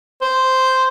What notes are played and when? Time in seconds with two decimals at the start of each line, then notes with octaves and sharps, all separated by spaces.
0.22 C5